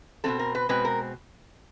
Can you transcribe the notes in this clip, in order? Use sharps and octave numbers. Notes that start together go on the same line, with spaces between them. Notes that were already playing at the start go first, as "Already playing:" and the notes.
B2 G#3 C4 A4
A#4
B4
B2 G#3 C4 B4
A#4